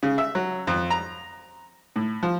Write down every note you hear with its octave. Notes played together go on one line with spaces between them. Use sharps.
C#3
E5
F#3
F2
A#5
A2
F3